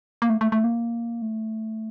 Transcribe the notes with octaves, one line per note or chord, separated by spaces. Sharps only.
A#3
A3
A3
A3
A#3
A3